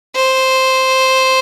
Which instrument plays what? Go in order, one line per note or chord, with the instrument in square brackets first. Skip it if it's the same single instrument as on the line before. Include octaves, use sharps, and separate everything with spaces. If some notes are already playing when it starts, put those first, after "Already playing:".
[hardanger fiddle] C5